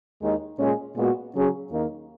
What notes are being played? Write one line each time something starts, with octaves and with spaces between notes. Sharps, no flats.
D#2 D#3 G#3 D#4
A#2 G#3 C#4 G#4
A#2 G#3 B3 F#4
C#3 F#3 C#4 G#4
D#2 D#3 A#3 D#4